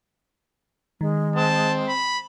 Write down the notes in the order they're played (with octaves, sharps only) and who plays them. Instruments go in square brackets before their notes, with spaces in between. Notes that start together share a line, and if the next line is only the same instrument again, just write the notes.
[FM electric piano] D#3 [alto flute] G#3
[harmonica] C4 [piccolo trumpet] A5
[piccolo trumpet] B5